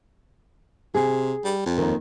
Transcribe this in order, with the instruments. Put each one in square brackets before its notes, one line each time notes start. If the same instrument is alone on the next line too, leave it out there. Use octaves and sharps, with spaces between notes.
[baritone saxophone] C3 [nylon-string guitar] G#4
[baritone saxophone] G3
F2
[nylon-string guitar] D#2 D#3